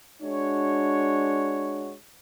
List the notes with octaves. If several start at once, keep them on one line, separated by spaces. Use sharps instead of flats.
G#3 D4 F#4 C#5